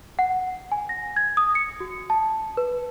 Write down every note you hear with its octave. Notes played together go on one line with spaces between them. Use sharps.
F#5
G#5
A#6
G#6
D#6
C#7
F#4
A5
B4